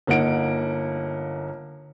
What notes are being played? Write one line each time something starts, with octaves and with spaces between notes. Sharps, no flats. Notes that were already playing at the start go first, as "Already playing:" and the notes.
G1 A#3 D#4 F#5 D7